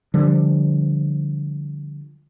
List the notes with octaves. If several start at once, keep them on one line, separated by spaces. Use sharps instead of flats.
D3 F3 G3